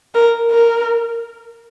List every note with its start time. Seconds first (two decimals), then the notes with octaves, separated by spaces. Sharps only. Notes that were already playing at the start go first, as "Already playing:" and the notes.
0.14 A#4
0.51 A#4